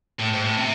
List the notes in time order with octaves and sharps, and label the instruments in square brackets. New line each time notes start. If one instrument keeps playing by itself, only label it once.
[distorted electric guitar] A2
G#2
A2
C3